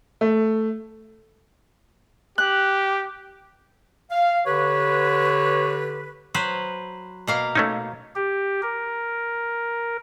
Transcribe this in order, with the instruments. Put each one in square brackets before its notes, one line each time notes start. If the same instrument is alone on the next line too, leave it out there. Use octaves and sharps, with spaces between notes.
[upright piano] A3
[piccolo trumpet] G4 [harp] F#6
[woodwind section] F5
[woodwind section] D3 G4 B4 [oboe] C#5
[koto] F#3 B4 C5
B2 A#3 F5
[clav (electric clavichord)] A3 C#4 D#4
[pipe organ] G4
A#4